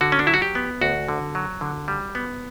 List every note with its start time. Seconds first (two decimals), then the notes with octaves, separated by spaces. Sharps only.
0.01 D3 F#4
0.12 C#4
0.19 D4
0.27 F#3 E4
0.34 F#4
0.42 G4
0.55 B3
0.81 D2 F#4
1.08 D3
1.35 F#3
1.61 D3
1.88 G3
2.15 B3